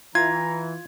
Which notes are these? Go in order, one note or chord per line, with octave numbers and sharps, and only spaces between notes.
E3 F4 A#5 G#6